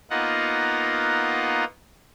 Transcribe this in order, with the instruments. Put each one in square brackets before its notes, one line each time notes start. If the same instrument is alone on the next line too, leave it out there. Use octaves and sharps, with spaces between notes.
[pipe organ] A#3 B3 D#4 F4 D#5 F#5